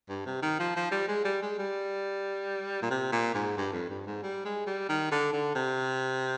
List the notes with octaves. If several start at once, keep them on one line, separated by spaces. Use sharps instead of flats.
G2
C3
D#3
F3
F3
G3
G#3
G3
G#3
G3
A#2
C3
A#2
G#2
G2
F2
G2
G#2
G3
G#3
G3
D#3
D3
D3
C3